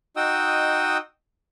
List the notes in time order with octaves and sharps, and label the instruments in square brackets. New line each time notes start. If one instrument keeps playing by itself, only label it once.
[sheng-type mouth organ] D#4 F#4 D#5 G5 D#6 E6